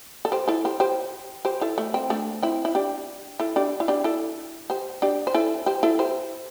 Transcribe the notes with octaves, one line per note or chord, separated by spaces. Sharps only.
A4
G4 C5
E4 A4
G4 C5
G4 C5
G4 C5
E4 A4
A3
C4
A3 D4
C4 E4
E4
D4 G4
E4 A4
D4 G4
E4
D4 G4
E4 A4
G4 C5
D4 G4
C5
E4 A4
G4 C5
E4 A4
G4 C5